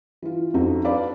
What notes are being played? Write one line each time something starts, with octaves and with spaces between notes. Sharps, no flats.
E3 F4
F2 D#4 F#4
D4 B4 D5 F5 B5